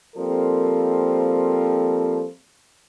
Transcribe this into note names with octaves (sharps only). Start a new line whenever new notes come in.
F3 G3 A#3 C4 A4 A#4